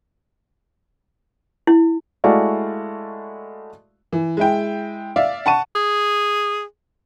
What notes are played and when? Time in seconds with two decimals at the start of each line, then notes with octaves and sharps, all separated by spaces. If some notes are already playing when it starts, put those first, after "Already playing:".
1.67 E4
2.24 G#3 A3 E4 F#4 D5 F5
4.13 E3
4.37 G#3 E4 G5
5.16 D5 E5 F5
5.46 F#5 A5 C#6 D#7
5.75 G#4